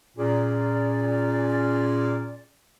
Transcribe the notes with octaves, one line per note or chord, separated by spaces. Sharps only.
A#2 C#4 G#4 D5